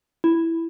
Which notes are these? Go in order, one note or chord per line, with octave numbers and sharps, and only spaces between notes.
E4